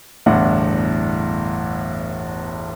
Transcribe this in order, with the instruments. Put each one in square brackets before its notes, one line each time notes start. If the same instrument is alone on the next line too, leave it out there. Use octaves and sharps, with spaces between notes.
[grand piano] G1 E2 A2 D4 F#5